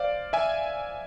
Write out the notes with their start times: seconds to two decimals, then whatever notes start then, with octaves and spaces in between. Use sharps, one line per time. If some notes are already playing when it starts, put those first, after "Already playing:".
Already playing: C5 D5 F5
0.33 E5 G#5